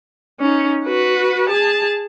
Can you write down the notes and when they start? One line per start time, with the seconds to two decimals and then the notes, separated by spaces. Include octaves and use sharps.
0.40 C#4 D#4
0.84 F#4 B4
1.49 G#4 A5